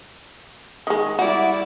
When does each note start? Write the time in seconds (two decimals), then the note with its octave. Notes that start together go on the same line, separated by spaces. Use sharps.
0.87 D#3 G#3
1.19 G3 E4 F#4 D5